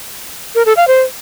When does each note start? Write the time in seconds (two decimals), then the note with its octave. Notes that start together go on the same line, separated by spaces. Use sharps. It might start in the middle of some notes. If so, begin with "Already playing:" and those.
0.55 A#4
0.66 A4
0.77 F5
0.88 C5